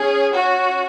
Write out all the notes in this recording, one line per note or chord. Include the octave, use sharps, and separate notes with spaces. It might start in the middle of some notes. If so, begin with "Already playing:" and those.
Already playing: C#4 G#4
F#4